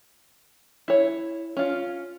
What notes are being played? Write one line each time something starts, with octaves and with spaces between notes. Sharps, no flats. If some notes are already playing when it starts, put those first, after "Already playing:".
E4 C#5
C#4 F4